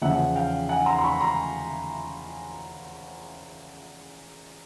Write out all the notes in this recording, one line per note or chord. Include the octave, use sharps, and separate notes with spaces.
E2 C#3 F3 E5 F#5
F5 G5
F#5 G#5
A#5 C6
C6
B5 C#6
A#5 C6